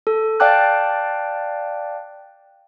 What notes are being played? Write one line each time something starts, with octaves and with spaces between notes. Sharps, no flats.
A4
D5 F5 G5 A5 D6 F#6